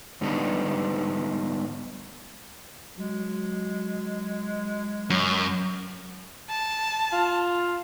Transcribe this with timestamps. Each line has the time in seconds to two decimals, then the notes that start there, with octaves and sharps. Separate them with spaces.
0.21 G#2 D3 G3 B3 D4 D#4
2.98 F#3 G#3
5.10 F#2
6.49 A5
7.12 F4